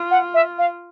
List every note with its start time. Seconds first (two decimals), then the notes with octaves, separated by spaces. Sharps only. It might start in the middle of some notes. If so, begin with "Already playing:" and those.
Already playing: F4
0.11 F#5
0.34 E5
0.58 F5